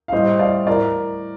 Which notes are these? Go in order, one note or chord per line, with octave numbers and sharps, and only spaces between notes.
F5
A2 G3 C5 D#5
D5 F5
A2 A#4 D5